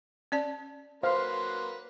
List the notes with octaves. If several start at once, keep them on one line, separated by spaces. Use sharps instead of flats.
C#4 D5 A5
F#3 A#3 B4 C5 F5 C6